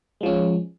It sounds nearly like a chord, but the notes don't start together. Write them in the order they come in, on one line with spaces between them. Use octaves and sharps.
G#3 F3 C#4